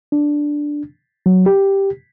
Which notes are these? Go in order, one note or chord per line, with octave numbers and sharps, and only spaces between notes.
D4
F#3
G4